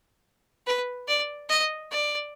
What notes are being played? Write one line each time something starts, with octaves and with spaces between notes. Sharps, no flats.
B4
D5
D#5
D5